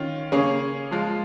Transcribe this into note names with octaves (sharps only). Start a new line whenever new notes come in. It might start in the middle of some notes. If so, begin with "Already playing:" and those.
Already playing: D#3 C#4 F4
C#3 A#3 C#4 G#4 C#5
F3 G#3 F4